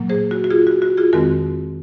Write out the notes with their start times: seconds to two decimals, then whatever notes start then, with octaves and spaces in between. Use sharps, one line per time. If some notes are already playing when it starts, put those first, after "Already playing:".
Already playing: A#2 F#3 A#3
0.09 G#4 C5
0.31 F#4
0.44 F#4
0.51 F4 G#4
0.67 F#4
0.82 F#4
0.97 F4 G#4
1.13 F2 D#3 G#3 C4 F#4 A#4